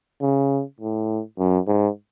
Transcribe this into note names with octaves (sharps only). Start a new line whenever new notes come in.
C#3
A2
F#2
G#2